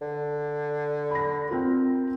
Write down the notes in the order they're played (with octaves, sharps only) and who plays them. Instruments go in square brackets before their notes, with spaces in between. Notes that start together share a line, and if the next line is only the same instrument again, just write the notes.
[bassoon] D3
[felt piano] B5 A#6
C4 F4 A#4